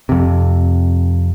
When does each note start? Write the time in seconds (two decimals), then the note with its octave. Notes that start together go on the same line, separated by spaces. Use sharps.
0.09 F2 C3